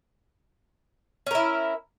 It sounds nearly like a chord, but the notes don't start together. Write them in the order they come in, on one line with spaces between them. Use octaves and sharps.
C#4 A#4 E4